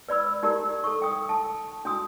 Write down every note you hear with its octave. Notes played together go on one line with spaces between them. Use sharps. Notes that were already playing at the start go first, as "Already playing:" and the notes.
B4 D5 B5 E6
D#4 G4 A#4 D5 A#5
A4 C#6
G5 D#6
A5
D4 F#4 D#6